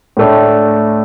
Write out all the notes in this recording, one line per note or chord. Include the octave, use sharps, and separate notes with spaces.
A2 A3 D4